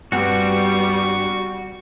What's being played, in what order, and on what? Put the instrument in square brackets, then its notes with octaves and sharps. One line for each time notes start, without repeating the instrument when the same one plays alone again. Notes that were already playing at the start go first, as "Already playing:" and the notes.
[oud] G2 B3 C4 [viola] G3 [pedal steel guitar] F#4 [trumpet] C#6